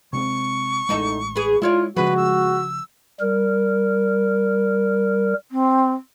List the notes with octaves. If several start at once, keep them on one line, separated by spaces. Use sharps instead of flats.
C3 G#3 C4 C#6
A1 E2 G#3 D#4 A4
G#4 B4
G#3 E4 F4 C#5 D5
C#3 F3 G#3 F#4 B4
E6
G3 A#4
C4